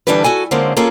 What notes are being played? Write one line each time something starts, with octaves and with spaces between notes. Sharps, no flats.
D3 E3 G3 D4 A4 B4
F#4 A4 G#5
D3 G#3 A#3 C4 C#4
A#3 C#4 F4 G#4 A4